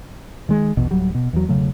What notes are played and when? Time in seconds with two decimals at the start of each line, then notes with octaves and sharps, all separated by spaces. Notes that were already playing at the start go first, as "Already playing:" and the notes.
0.49 D#3 G#3
0.77 A#1 E2 B2
0.91 D1 F#3 G3
1.15 B2
1.33 E2 F#3
1.48 E1 C#3 F#3 A3